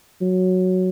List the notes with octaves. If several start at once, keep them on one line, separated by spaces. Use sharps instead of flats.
F#3